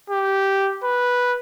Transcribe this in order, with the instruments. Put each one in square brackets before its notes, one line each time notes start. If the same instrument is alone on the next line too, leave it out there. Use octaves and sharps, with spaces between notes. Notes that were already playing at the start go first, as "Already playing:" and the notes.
[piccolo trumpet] G4
B4